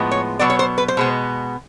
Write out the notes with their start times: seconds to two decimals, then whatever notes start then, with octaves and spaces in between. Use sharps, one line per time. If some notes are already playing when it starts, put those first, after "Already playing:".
Already playing: A2 F3 G#3 B3
0.11 C#5
0.39 B2 F#3 B3 D5
0.50 C#5
0.59 C5
0.78 B4
0.88 C5
0.97 B2 G#3 B3